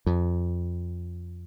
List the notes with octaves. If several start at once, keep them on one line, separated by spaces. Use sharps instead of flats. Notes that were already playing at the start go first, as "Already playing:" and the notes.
F2